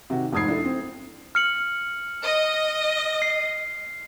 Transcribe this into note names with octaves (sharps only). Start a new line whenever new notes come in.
C3 D#3 F#4
F1 G#2 D#6 G#6 C7
D4 E4 A4
C4
F6 C#7 F#7
D#5
C7